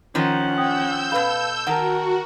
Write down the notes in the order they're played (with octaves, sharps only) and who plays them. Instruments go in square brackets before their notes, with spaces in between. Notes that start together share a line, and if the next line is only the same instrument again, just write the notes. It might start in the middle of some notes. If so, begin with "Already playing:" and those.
[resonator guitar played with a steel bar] D#3 F3 D#4 [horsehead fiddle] C#4 F#5
[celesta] G5 D#6 [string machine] E6 G6
[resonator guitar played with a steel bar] B2 A4 [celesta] B4 F5 B5
[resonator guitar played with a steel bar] D#3 [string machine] F#4 [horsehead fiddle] A#4 [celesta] F#5 A5